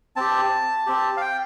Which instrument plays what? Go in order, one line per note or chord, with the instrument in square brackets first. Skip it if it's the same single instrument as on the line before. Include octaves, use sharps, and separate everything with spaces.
[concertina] C4 G4 A5
C4 G4
F5
G5